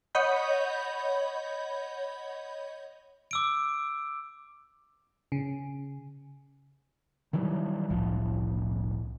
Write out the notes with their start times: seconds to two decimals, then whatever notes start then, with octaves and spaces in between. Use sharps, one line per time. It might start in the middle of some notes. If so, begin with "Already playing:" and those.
0.15 C#5 D#5 F#5 B5 G6
3.31 D6 E6 D7
5.32 C#3
7.33 D#3 E3 F#3 G3
7.90 E1 C2 A2 F3